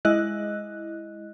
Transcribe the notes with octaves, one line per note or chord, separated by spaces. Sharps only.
G#3 E4 D#5 F#6